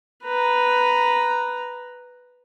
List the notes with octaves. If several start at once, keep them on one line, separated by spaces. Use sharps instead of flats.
B4 A#5